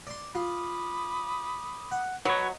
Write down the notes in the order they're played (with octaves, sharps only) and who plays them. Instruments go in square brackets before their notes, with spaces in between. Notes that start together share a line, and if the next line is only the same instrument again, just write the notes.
[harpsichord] D5 C6
[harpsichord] F4 [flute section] B5 D6 D#6
[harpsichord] F#5
[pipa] F#3 [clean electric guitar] F#4 B4 C#5 [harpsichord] D#5